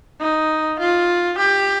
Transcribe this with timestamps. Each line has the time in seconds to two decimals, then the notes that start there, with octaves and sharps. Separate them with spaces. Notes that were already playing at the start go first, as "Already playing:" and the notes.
0.20 D#4
0.79 F4
1.38 G4